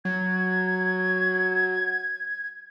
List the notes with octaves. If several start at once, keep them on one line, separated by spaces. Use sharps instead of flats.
F#3 G#6